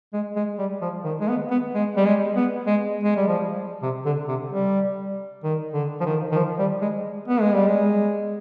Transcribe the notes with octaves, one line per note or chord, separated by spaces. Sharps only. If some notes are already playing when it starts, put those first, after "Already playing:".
G#3
G#3
G3
F3
D#3
G#3
B3
B3
G#3
G3
G#3
B3
G#3
G#3
G3
F3
C3
D3
C3
G3
D#3
D3
F3
D#3
D#3
F3
G3
G#3
B3
G#3
G3
G#3